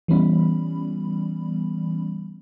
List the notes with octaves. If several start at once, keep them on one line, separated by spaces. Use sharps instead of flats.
E3 G3 B3 C#4 B5